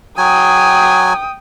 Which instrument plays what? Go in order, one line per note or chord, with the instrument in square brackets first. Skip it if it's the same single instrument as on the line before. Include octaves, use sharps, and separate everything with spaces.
[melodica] F#3 G#5 [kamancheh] G5 D#6